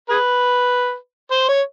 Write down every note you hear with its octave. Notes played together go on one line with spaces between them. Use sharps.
G#4 B4
C5
C#5